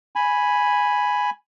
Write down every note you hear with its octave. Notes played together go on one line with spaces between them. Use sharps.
G#5 B5